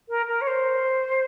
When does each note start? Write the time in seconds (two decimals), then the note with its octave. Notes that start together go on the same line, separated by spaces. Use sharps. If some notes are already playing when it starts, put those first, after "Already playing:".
0.09 A#4
0.28 A#4
0.41 C#5
0.47 C5